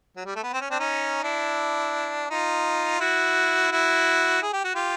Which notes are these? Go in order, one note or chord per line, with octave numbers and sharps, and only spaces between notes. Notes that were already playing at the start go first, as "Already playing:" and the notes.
F#3
G3
A3
B3
C4
C#4
C4 D4
C#4 D#4
D4 E4
D#4 F4
E4 F#4
E4 F#4
G#4
G4
F#4
F4 G4